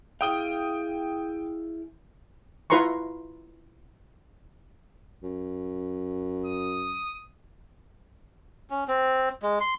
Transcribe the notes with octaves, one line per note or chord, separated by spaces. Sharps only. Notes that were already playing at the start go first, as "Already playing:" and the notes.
E4 G#4 F5 G5 D#6 G7
E4 F4 B4 A#5 C6 C#6
F#2
D#6
C#4
C4
G#3
C6